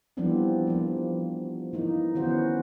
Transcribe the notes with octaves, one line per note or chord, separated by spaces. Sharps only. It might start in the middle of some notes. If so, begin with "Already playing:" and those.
E3 F3 G3 B3 C4 D4
F3 A#3
E3 A#3 D#4
D#3 E3 B3 C#4 F#4 C5